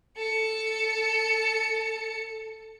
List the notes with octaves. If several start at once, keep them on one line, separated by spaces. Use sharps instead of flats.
A4 C#7